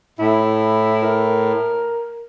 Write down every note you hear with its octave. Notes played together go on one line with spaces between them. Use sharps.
A2 E4
A#4